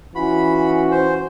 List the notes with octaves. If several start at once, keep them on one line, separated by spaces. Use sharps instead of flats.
E3 C#4 F4 F#4 B5
C5